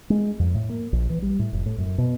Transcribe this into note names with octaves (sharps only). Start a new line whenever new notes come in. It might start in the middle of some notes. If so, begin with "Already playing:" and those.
G#3
F2
A2
A#3
A#1
E3
G3
A2
F1
A2
F#2
B2